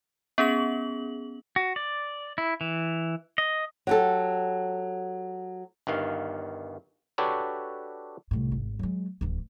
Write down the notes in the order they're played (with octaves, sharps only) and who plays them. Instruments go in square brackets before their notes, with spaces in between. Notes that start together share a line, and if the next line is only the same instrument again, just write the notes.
[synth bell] B3 C#4 G#4 F#7
[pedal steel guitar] F#4
D5
E4
E3
D#5
[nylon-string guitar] F#3 G4 A4
[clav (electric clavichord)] G1 G2 D#3 F5
D4 F#4 G4 A4 B4 C#5
[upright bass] C2 A2
G#1
F#3 G#3
D1 E3